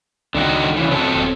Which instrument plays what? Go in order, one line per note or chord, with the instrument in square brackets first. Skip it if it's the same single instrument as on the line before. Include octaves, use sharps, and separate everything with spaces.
[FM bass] C#2 [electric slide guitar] D3 D#3 F#4
[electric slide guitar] C#3 E3
F#3 C4 A4
[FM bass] D#1